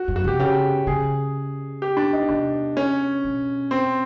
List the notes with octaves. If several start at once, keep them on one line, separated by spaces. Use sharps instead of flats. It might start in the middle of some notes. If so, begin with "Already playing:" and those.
Already playing: F#4
F#2
F#4
C3 G4
C#3 G4
C#3 G#4
G4
D4
D#4
C3 D4
C#4
B2
C4